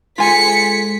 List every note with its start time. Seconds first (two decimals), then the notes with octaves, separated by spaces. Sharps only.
0.18 G#3 F4 G#4 A4 G#5 B6 C#7